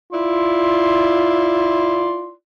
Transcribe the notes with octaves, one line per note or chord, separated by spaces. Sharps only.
E4 F4 D5 C6